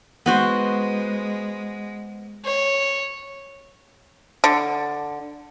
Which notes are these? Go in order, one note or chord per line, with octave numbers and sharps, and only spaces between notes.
G#3 B3 F#4 C5
C#5
D3